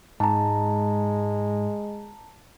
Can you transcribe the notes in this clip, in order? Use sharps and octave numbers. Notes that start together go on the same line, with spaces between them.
G#2 G#3 A5 A#5